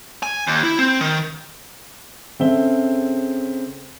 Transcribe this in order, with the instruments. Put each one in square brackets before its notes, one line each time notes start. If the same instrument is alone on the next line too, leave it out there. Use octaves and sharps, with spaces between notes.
[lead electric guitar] G#5
D#2
E4
C4
D#3
[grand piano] C#3 C4 G#4 A4 E5 G7